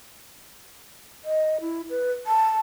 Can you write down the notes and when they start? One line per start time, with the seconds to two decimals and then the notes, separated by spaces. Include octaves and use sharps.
1.24 D#5
1.61 E4
1.90 B4
2.27 A5